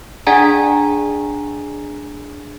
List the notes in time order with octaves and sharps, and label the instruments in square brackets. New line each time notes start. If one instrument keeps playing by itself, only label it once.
[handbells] D4 G#4 D5 F#5 G#5 A#5